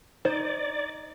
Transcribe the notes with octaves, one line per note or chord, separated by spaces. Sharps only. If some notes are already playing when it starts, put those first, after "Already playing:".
D#4 C5 D5